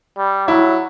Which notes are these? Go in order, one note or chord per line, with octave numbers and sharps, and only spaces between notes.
G3
F#3 E4